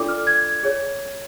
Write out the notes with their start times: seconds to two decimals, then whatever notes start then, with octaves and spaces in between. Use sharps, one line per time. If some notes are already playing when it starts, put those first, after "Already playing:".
Already playing: D4 F4 A4 D5 D6
0.08 F6
0.27 G#6
0.63 G#4 C#5